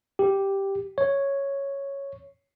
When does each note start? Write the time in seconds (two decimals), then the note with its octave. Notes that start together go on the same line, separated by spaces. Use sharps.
0.19 G4
0.98 C#5